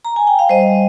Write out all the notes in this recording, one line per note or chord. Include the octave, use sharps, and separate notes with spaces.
A#5
G#5
G5
F5
G3 C5 D#5